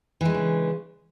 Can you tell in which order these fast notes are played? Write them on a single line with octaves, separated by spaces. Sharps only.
E3 G#3 D4 C#3